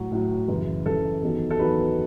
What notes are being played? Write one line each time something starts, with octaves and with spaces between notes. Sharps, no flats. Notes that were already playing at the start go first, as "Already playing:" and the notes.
Already playing: A2 F#3 F#4
A2 F#3
F#2 C#3 E3
F#2 C#3 E3 A4
E2 D#3 F#3
A4
E2 D#3 F#3 B4